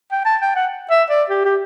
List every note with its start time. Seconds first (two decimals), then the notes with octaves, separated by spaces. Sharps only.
0.11 G5
0.25 A5
0.41 G5
0.55 F#5
0.90 E5
1.10 D5
1.30 G4
1.45 G4